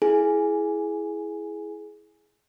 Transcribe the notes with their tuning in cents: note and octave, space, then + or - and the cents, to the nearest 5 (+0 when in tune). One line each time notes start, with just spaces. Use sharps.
E4 +0 G#4 +15 G#5 +0